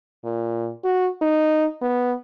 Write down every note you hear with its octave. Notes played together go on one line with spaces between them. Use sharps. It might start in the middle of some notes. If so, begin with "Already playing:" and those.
A#2
F#4
D#4
B3